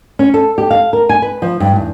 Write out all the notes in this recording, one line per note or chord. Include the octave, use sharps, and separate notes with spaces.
C#4
A4
G4
F5
A#4
G#5
B4
F3
G2
E2